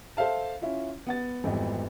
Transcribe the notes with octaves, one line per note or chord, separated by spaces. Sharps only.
A4 C5 E5 F5 A5
C#4 E4 F4
B3 F#5 A6
G#1 F2 E3 G3 B3